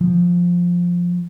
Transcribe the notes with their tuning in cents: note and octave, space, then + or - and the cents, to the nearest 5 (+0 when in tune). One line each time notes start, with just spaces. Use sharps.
F3 +5